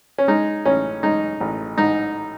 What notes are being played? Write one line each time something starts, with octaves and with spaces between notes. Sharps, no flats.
C#4
G#3 D#4
A1 C#4
G#3 D#4
A1
G#2 D#4